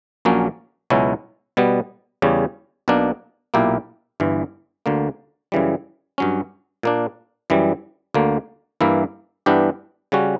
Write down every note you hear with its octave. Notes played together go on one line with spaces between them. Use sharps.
A#1 A#2 F#3 A#3 C#4
C#2 B2 F#3 C#4 E4
B2 G3 B3
E2 C#3 G3 C#4
B1 B2 A#3 D4
B1 A#2 A#3 E4 G4
G1 G2 E3
D2 D3 A#3
F#2 C#3 E3 G3
G2 F#3 C#4
A#2 A#3 D4
F#2 E3 G3
D2 D3 A#3
G2 E3 A#3 E4
G2 E3 B3 D4 G4
C#3 G3 C#4 F#4